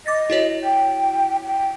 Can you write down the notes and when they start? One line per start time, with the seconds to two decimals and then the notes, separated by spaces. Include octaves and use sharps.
0.06 D#5 D6 A6 A#6
0.30 E4 F#4 C#5
0.63 G5
1.44 G5